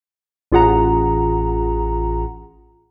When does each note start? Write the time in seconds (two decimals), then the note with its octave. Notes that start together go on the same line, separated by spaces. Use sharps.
0.52 A1 F4 G#4 F#5 A#5